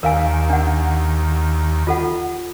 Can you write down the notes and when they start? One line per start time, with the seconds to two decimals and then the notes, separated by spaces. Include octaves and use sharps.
0.03 D#2 A#4 F5 G#5
0.50 D4 F#5
1.87 F4 A4 F#5